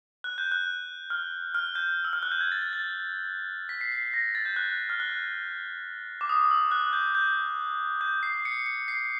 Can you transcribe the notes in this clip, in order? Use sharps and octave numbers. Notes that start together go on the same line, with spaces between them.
F#6
G6
F#6
F6
F6
G6
E6
F6
F#6
G6
G#6
A6
A6
A6
B6
C7
C7
B6
A#6
A6
G6
F#6
F6
F#6
D6
D#6
E6
F#6
G6
G6
G6
C7
C#7
C#7
C7